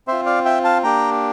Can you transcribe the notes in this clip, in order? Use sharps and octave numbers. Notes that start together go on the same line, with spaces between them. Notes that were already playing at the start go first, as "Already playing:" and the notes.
C4 F4 C5 E5
D5 F5
E5 G5
F5 A5
A#3 D4 G4 G5 A#5